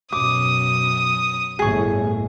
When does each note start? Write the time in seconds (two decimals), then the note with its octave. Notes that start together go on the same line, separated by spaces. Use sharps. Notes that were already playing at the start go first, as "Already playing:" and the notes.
0.12 F#2 B2 D6 D#6
1.59 G1 A2 G#4 C#6